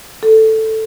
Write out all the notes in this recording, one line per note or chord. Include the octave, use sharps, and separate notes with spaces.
A4